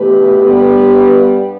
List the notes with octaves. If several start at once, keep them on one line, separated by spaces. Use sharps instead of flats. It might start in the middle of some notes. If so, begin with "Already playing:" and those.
Already playing: E2 B2 A3 G4 B4
G2 G3 B3